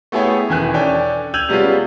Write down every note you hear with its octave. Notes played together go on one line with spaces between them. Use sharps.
A3 B3 E4 G#4 C#5 G5
E1 D#3 E3 G#5 F#6
C#4 D4 A4 G5 G#5
E6 G6 G#6 D#7 F7 F#7
C3 G3 G#3 B3 C#4 F4